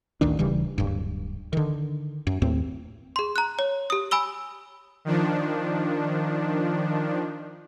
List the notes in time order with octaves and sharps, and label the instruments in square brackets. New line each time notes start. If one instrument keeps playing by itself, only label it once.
[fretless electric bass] A1 D2 D#3 D4
D#1 C#3 E3 G3
D1 G2
D3 D#3
F#2
D#2 A2 C4
[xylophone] G#4 C6
A#5 F#6
C#5
G4 D#6
G#5 B5 E6 G7
[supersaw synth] D#3 F3 D4